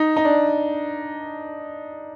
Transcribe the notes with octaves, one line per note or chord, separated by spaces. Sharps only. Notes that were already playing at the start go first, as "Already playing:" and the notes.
Already playing: D#4
D#4
D4